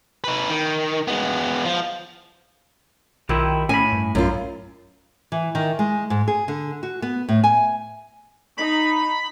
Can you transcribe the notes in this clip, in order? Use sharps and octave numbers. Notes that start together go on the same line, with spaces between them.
D#4 B4
D#3
G#3 B3
F3
B1 D#3 E4 F4 G4
A2 C#4 G#5 B5
G2
B1 F#2 F4
E3
D#3
G#3
G#2
G#4
D3
F#4
B3
A2
G#5
D#4 B5